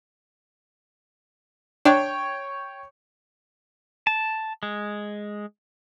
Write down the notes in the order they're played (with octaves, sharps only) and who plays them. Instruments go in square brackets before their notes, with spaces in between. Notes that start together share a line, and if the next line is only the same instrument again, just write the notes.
[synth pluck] D4 [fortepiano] C#5 G5
[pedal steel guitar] A5
G#3